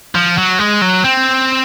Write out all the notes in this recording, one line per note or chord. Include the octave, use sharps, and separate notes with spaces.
F3
F#3
G#3
F#3
C4